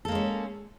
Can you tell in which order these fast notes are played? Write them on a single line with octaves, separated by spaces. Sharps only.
A4 A#3 G#3 C#4